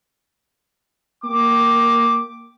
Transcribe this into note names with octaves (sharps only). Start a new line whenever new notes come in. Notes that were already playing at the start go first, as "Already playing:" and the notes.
A#3 G4 D6